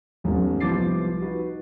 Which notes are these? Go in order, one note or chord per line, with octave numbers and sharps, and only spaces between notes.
A1 E2 G#2 A3 C#4
C2 F3 B3 D6 A6 C7
D#4 F#4 B4